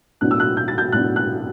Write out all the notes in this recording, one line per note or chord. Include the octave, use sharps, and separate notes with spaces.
A2 F#3 B3 D4 F#6
E6
F#6
G6
A6
G6
A2 F#3 B3 D4 F#6
F#6